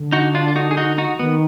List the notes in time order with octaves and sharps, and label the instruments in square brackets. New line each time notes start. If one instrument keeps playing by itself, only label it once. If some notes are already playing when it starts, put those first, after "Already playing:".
Already playing: [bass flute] D3
[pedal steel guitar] D#4 F#4
D4 F4
F4
D#4 F#4
G#4
D#4 F#4
D#4 F#4
[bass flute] F3
[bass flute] D#3 [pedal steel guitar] B3